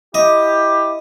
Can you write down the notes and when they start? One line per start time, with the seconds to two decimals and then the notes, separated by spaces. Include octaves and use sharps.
0.15 E4 G4 D#5